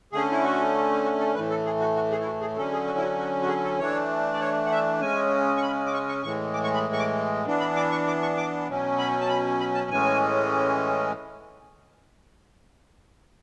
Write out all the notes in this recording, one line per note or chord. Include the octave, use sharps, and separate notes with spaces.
D3 A3 C#4 G#4
E4
F#4
F#4
A4
A2 E3 A3 B4
A4
G#4
F#4
F#4
G#4
E4
F#4
G#4
D3 F#3 C#4 A4
G#4
F#4
E4
F#4
F#4
F#4
G#4
A4
E3 A3 D4 C#5
D5
C#5
F#5
E5
C#3 G#3 C#4 G#5
C#6
B5
D6
C#6
C#6
A2 E3 G#3 C#6
D6
C#6
B5
C#6
D6
E3 B3 D4
B5
D6
C#6
D6
C#6
D6
B2 F#3 C#4
B5
A5
B5
B5
A5
A2 E3 G#3 C#4 G#5